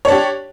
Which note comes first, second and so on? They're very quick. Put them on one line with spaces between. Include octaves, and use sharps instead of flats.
C#5 D4 G4